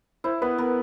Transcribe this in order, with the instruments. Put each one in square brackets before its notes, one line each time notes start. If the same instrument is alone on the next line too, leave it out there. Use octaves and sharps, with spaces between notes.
[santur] E4 [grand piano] C5
[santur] B3 [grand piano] B4
[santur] B3 [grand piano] A#4